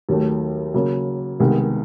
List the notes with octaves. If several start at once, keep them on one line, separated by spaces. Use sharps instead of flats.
D#2 D#3 F#3 A3
C#3 F#3 A#3
C2 C3 D#3 G#3 B3